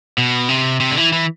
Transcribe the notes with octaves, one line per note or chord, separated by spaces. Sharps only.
B2
C3
C3
D3
E3
E3